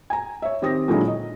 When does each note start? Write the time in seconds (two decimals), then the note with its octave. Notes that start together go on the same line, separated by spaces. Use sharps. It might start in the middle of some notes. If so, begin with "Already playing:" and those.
0.10 G#5 A#5
0.42 C#5 E5
0.62 D#3 C4 G4 D#6 A#6
0.88 A#2 D3 F#3 G#3 D#4 E4
1.07 D#5